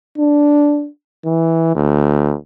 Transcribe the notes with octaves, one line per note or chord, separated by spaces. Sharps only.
D4
E3
D2